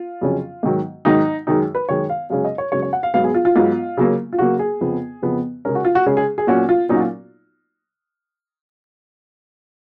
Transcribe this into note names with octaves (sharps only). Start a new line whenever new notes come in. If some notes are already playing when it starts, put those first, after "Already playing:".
Already playing: F4
F2 C#3 F#3 C#4
G#2 D#3 F#3
G#2 D#3 F#3 D#4
F#2 D#3 G#3 D#4
B4
F#2 D#3 G#3 C#5
F5
F#2 C#3 G#3 C#4 F5
D#5
C#5
F#2 C#3 G#3 C#4 C#5
C#5
F#5
F5
G#2 F#3 B3 F5
G#4
F4
F4
G#2 F#3 B3 F4
C#3 F#3 A#3
F4
C#3 F#3 A#3 F#4
G#4
F2 C#3 F3 B3
F2 C#3 F3 B3
C#3 G#3 C#4 A#4
F#4
F4
F#4
C#3 G#3 C#4 G#4
G#4
G#4
A#2 F#3 C#4 F#4
F4
A#2 F#3 C#4 D#4
F#4
F4